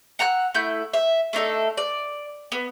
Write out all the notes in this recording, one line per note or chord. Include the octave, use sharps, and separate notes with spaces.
F#5 A#5 E6 F#6
A3 E4 G6
E5
A3 D4 D#4 A4
D5
B3